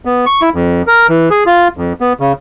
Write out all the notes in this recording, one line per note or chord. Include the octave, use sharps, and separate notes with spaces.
B3
C#6
E4
F2
A#4
E3
G#4
F4
F2
B3
C#3